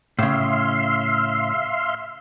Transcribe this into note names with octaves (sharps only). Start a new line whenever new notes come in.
A2 C#3 E5 F5 C6